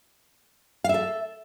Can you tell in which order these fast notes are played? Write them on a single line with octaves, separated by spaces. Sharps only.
F5 E5 A4